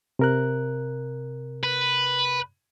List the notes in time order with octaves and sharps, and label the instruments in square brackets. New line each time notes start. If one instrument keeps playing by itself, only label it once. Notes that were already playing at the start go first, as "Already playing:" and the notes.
[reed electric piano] C3 A#4 F#6
[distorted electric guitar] B4